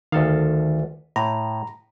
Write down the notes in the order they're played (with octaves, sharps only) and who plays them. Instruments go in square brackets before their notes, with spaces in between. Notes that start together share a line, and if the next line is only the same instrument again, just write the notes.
[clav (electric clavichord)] D2 A4 F5 [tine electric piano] D#3
[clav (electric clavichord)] A2 [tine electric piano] A#5